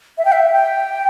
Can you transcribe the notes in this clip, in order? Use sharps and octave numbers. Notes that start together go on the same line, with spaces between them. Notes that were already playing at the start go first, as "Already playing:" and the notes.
E5
G5
E5
G5